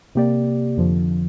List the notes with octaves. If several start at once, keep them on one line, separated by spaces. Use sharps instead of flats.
C3 A#3 G4 D5
F2 D3 F3